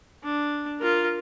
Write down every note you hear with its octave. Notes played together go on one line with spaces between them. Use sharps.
D4
F4 A#4